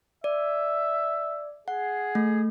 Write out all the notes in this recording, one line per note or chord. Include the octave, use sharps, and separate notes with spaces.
D5 E5
G#4 F#5
A3